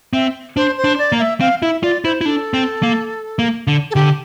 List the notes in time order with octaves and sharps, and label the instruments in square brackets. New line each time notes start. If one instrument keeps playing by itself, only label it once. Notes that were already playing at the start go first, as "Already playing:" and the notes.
[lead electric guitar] C4 [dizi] E5
[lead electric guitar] D4 [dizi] C5
[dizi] C5
[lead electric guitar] D4
[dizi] D5
[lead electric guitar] A#3
[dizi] E5
[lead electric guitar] C4 [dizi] F5
[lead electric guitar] E4 [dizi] E5
[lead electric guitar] F4 [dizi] D5
[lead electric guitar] E4 [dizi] C5
[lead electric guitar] E4
[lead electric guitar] D4 [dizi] A4
[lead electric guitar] C4
A#3
A#3
D3
[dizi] A4
[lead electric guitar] D3 [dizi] G4